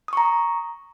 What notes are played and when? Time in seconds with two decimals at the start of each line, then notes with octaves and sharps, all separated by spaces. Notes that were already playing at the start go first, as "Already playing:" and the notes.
0.08 D#6
0.13 C#6
0.17 A#5